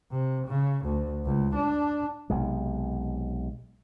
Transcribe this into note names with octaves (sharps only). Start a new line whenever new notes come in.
C3
C#3
D2
C#2
D4
B1 C3 G#3